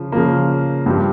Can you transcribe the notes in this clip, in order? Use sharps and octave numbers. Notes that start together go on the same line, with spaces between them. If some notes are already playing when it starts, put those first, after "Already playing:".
Already playing: C#3 F3
C#3 F3 A#3
G2 F3 C4 G4